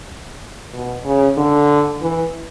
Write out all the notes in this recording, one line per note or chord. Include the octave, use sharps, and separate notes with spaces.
B2
C#3
D3
E3